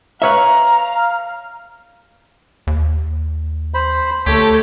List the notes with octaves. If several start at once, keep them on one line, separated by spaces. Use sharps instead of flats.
B4 C#5 E5 F5 A#5
D#2
C5 B5
D2 A3 G4 A4 C#5